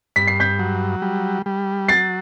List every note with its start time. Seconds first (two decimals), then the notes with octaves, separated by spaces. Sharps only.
0.16 G2 B6
0.27 C7
0.40 G6 B6
0.59 F#3
1.02 G3
1.46 G3
1.88 F#3 A6 C7